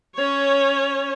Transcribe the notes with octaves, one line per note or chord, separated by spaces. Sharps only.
C#4 C#5